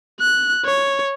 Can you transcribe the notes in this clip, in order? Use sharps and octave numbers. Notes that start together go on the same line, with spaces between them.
F#6
C#5